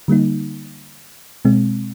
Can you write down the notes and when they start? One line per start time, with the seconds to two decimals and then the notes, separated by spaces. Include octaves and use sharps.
0.08 D3 G3 A#3 D#4
1.45 B2 G#3 C4